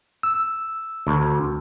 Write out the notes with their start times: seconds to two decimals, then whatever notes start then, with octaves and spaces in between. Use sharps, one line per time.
0.23 E6
1.07 D2